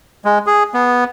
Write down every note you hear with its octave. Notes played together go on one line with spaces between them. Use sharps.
G#3
G#4
B3